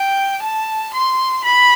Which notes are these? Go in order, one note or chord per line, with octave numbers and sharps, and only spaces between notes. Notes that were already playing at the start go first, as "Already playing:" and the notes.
Already playing: G5
A5
C6
B5